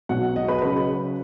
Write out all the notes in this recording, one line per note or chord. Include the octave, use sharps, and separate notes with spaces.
B1 B2 F#3 F#5
D#5
B4
C#3 F#3 B4